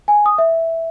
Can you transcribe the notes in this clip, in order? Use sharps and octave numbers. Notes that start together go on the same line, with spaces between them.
G#5
D#6
E5